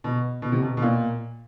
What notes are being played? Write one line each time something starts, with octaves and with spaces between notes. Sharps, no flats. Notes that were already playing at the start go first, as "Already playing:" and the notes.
B2
B2
C3
B2
B2
A#2